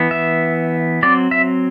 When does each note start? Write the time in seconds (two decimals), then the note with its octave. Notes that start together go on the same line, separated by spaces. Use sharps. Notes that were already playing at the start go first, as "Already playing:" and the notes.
Already playing: E3 B3
0.11 E5
1.03 F#3 C4 D5
1.31 E5